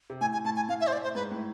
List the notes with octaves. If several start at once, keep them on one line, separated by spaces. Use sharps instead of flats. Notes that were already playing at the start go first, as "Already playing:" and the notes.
C3
A2 G#5
G#5
A2 A5
G#5
A2 F5
E5
C5
D5
C5
G#2 B4
A2